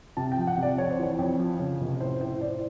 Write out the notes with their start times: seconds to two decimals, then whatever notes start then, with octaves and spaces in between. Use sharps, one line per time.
0.17 C3 A5
0.32 G5
0.37 F3
0.47 F#5
0.57 C3
0.63 D5
0.78 F2 C#5
0.90 C5
0.99 E3 C#5
1.19 F2
1.39 F3
1.60 C#3
1.81 F1
2.00 A2 C5
2.21 A2 C5
2.41 A2 D5